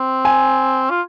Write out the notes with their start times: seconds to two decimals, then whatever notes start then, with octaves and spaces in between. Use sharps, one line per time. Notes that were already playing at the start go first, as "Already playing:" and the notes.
Already playing: C4
0.25 G#5
0.90 F4